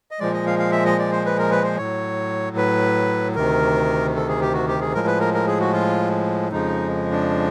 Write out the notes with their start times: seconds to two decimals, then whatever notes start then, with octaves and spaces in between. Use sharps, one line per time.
0.11 D#5
0.20 A#2 F3 G#3 D5
0.33 D#5
0.46 F5
0.59 F5
0.72 E5
0.85 D#5
0.99 D5
1.12 C5
1.26 B4
1.39 A#4
1.51 B4
1.64 C5
1.78 A2 F#3 C#5
2.57 B4
3.35 D2 C3 D#3 A#4
4.15 A4
4.29 G#4
4.41 G4
4.54 F#4
4.68 G4
4.81 G#4
4.94 A2 F3 G#3 A#4
5.07 B4
5.20 A#4
5.34 A#4
5.47 G#4
5.60 F#4
5.73 F4
6.52 F2 C#3 F3 G#3 D#4
7.11 D4